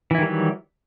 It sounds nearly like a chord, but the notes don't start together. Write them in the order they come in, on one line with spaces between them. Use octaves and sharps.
E3 E4 D#3 G3 F#3